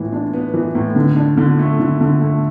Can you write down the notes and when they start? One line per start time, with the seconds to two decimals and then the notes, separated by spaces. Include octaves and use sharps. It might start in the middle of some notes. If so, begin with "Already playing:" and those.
Already playing: A2 E3
0.12 D4
0.33 B3
0.54 E3
0.75 A2
0.96 D3
1.16 D4
1.38 D3
1.59 A3
1.80 D3
2.01 D3
2.21 A3